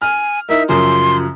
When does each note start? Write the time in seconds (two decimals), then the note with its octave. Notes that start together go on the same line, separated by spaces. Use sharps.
0.02 G#5 F6
0.49 D#4 E4 A#4 E5
0.69 F#2 C#3 F3 C6